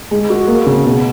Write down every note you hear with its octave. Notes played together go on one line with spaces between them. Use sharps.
G#3
F#4
A#3
C#3
B2